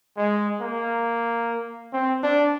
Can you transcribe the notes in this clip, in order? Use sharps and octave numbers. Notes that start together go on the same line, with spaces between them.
G#3
A#3
C4
D4